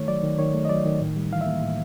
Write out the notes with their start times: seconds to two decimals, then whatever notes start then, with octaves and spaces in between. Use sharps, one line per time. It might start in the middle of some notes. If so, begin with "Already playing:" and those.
Already playing: D#3 A3 C#5
0.08 F#3 D5
0.23 D#3
0.39 D#3 C#5
0.54 A3
0.65 D#5
0.69 F#3 D5
0.85 D#3
1.00 A2
1.16 G3
1.32 E3 F5
1.41 A#3 E5
1.63 A2